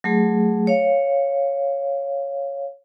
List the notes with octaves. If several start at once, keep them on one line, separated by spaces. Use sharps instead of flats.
F#3 A3 G#4
C#5 F5